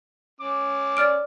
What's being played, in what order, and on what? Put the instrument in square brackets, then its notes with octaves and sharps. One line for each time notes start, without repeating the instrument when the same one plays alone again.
[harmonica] C#4 D6
[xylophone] D5 F6 D7